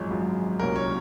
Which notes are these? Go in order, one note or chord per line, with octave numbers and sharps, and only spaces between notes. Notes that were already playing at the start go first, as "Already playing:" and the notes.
Already playing: G#1 F#2 F3 G#3
G#1 F#2 F3 G#3
C2 A#2 F#3 C#4 A#4
C#5